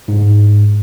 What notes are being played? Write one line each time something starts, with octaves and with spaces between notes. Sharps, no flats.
G#2